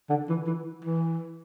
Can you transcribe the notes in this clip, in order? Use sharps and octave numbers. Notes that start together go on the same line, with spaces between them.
D3
E3
E3
E3